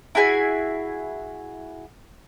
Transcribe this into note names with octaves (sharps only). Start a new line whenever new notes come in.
E4 F#4 G#4 G#5